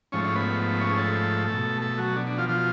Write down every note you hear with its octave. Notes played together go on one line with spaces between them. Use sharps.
G#2 F3 A3 C#4 C#5
C#4 C#5
B3 B4
C#4 C#5
G#4
A3 A4
B2 A3
A3 A4
F#3 F#4
D4
D4
F3 F4
F3 F4